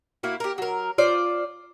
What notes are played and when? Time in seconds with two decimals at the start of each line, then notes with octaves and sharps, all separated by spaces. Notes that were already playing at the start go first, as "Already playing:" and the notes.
0.23 A#3 E4 F#4
0.40 G4 A#4
0.58 F#3 A#4
0.98 F4 C5 D5